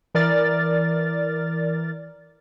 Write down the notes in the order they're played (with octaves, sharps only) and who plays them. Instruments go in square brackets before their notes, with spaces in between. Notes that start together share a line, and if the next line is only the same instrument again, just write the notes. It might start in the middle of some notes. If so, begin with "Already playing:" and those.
[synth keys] E3 A#4 D5 F6 A6